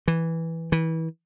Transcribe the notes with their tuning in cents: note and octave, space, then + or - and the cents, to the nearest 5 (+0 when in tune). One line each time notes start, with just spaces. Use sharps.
E3 -5
E3 -25